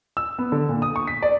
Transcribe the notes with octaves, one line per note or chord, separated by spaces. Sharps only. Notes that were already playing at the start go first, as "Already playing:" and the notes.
E6
B3
D3
A#2
D#6
C#6
B6
D5